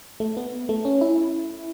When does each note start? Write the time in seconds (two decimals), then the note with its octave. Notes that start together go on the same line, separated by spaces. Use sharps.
0.20 A3
0.37 B3
0.69 A3
0.85 C#4
1.01 E4